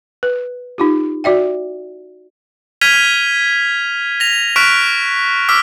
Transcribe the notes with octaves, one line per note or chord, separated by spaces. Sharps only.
B4
D#4 F4 G4
F#4 D5 E5 G5
F6 G#6 B6 D#7 F7 G7
A#6 F7
C#6 F6 F#6 B6 D7 F7
D6 E6 F6 B6